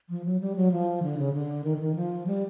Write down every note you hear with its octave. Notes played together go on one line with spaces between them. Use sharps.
F3
F#3
G3
F#3
F3
D3
C#3
D3
D#3
D3
D#3
F3
G3